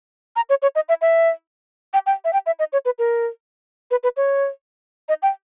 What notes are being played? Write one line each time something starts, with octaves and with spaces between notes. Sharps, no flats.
A#5
C#5
C#5
D#5
E5
E5
G5
G5
E5
G5
E5
D#5
C#5
B4
A#4
B4
B4
C#5
D#5
G5